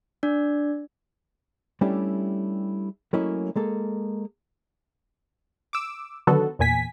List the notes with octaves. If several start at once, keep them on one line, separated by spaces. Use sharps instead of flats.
D4 D5
G3 A3 C#4 D4 E4 G4
F#3 A3 A#3 C#4 E4 D#5
G#3 A#3 A4
D6 E6
D3 D#3 F#3 B3 F#4 A4
E2 A#2 G#5 B6